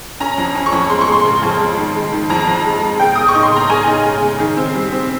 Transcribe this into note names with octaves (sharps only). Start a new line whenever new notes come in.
C#4 A#5
F2
C#4
C#6
F2
G#3 C6
C#6
G#3 C6
C#3
F2
G#3
D#3
G#3
D#3
F2 A#5
F2
G#3
G#3
C#3 G5
C#3 D#6
C#6
D#4
C6
C#3 A#5
C#3 G#5
D#4
G#3
C#3
D#3
C4
G3
C4